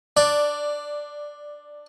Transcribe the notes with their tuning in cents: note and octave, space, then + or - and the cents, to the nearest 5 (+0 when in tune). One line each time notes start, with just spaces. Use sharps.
D4 +10 D5 +0